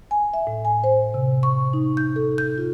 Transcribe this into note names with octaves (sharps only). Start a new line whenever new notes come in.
G#5
E5
A2
G#5
C5
C3
C#6
D#4
G6
A4
G6
F4